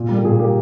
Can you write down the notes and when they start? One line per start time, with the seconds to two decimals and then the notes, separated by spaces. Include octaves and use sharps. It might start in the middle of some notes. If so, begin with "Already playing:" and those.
Already playing: A#2
0.09 G3
0.14 A#3
0.24 A#2 G#4
0.39 G3 A#3 G4